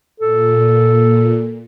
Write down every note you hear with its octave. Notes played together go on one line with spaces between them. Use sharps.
A#2 A4